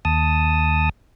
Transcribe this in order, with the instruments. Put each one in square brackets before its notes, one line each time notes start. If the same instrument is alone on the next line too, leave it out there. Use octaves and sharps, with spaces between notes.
[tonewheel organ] D#2 A5 D#6